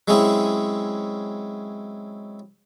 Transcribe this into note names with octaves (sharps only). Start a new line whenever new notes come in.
F#3 G#3 C4 C#4 E4 G#4